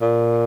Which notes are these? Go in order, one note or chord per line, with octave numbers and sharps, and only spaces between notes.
A#2